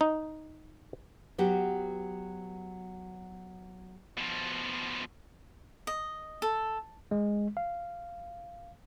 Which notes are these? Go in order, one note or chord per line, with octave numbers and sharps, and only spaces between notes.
D#4
F#3 B3 F#4 G4
B2 F3
D#5
A4
G#3
F5